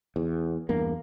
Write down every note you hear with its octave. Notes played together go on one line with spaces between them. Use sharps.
E2
E2 G2 A#3